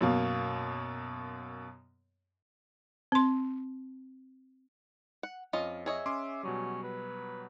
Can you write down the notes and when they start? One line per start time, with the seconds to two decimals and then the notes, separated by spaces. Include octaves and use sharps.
0.01 F#2 B2 A#3
3.12 C4 C6
5.23 F#5
5.53 F2 C#4 F4 D#5
5.86 G#4 C#5 D#5 E5
6.06 C#4 C6 D6
6.43 B2 F#3 G3 C#4
6.83 B4